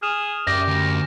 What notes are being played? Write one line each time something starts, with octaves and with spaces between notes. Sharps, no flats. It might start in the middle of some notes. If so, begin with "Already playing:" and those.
G#4 F6 E7 F7
F#2 G4 D5 E5 A#6
D2